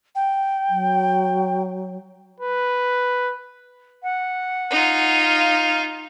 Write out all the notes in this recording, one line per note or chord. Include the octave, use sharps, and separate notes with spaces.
G5
F#3
B4
F#5
D#4 F4
F5